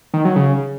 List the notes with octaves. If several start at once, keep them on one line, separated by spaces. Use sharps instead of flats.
D#3
F#3
C#3